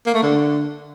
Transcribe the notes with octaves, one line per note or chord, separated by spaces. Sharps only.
A#3
A3
D3